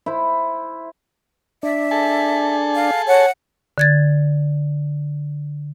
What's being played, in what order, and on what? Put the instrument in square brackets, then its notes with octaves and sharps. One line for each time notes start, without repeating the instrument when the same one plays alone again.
[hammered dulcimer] E4 C5
[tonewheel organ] D4 [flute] E5
[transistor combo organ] G#4 A4 A5
[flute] F5
[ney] C#5 [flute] F#5
[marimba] D3 G#6 A6